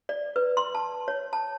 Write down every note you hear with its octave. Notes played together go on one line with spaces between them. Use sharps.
D5
B4
C6
A5
C#5
A5